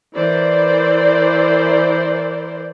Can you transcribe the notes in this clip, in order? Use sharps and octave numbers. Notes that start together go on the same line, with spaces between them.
E3 A#4 C5 D5